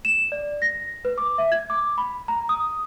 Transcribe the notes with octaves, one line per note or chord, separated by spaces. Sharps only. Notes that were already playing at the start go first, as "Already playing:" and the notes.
E7
D5
A#6
B4
D6
E5
G#6
D6
B5
A#5
D#6